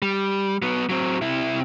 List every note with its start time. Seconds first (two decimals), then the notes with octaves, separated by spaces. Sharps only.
0.02 G3
0.62 F#3 B3
0.89 F#3 C4
1.21 C3 E4